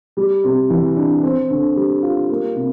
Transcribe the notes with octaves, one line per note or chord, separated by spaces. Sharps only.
G3
C3
E3
D4
C4
D3
G3
F4
A#3
C3